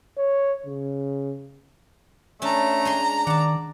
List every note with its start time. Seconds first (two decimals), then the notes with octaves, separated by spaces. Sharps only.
0.17 C#5
0.66 C#3
2.42 A3 C#4 D4 A5 A#5
2.85 G#3 G#5 C6
3.27 D#3 D5 F#5 A5